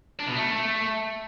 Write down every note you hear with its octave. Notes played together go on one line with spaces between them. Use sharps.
D4
B2
A3